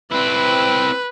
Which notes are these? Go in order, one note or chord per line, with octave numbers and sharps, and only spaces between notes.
C4 E4 B4